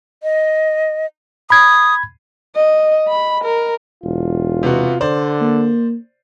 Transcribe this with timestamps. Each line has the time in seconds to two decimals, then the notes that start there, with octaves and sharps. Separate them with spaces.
0.23 D#5
1.50 B5 D#6 G#6
2.56 D#5
3.08 B5
3.44 A#4
4.04 E1 F4
4.63 C3 B3 F#4
5.01 D3 C5 D5
5.41 A#3